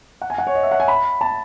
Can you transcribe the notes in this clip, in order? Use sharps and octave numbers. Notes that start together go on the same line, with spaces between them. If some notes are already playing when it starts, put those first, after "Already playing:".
F#5
G#5
F#5
C#5
D#5
E5
F#5
G#5
B5
A5